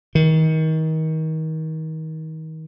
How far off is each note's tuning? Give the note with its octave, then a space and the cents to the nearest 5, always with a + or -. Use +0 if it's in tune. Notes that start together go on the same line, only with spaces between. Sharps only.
D#3 +30